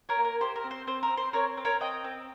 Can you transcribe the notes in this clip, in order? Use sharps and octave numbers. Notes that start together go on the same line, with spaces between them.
A#4 C#5
A#3
A#4
G4 C5
A#4
C4
C5
C4 C5
A#4
C4
C5
C4 A#4 C#5
C4
A#4 C#5
C4 D#5 G5
C4